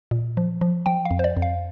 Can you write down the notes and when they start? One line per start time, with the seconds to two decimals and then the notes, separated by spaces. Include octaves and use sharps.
0.11 A#2
0.37 F3
0.61 F3
0.86 F3 G5
1.05 F5
1.11 F2
1.19 C5
1.24 D5
1.37 F2
1.42 F5